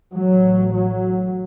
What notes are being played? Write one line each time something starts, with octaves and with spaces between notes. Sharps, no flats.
A1 A2 F#3
F#3